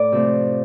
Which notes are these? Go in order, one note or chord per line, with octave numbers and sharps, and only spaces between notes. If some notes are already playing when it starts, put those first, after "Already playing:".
Already playing: A2 D5
C3 F3 A3